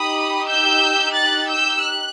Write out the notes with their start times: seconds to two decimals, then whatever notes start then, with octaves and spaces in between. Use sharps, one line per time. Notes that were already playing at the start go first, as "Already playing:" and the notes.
Already playing: D#4 G4 B5 D#6
0.47 E6 G6
1.15 F#6 A6
1.49 E6 G6
1.82 F#6